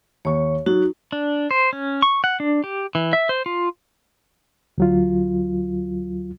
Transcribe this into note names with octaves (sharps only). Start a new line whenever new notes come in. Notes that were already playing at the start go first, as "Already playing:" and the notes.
D#2 C#5 C#6
F#3 D#4 F#4
D4
C5
C#4
C#6
F#5
D4
G4
E3
E5
C5
F4
D2 F#3 F4